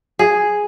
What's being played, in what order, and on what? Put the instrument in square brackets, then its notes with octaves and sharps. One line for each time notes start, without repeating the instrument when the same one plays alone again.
[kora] G#4